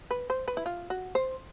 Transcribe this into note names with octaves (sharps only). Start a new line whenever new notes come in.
B4
C5
B4
E4
F4
F#4
C5